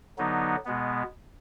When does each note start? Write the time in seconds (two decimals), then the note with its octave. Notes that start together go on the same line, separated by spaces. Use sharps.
0.18 D3 F#3 B3 D#4
0.65 B2 G#3 B3